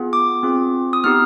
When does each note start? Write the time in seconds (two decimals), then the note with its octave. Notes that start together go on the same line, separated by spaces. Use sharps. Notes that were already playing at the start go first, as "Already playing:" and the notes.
Already playing: B3 F4 G#4
0.13 D6
0.43 C4 F4 G#4
0.93 D#6
1.04 B3 D#4 G4 F6